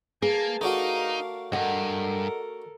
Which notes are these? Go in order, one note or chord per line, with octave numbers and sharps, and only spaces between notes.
A#3 G#4 B4 G#5 A5
A3 D4 D#4 F#4 A#4 F5
D2 G2 A4 A#4 D#5 F#5